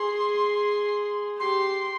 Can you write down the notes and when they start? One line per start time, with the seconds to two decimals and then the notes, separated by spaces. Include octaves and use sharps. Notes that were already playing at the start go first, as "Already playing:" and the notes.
Already playing: G#4 C6
1.39 G4 C6